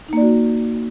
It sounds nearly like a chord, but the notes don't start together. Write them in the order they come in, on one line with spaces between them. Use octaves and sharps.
D#4 A#3 D5 F#4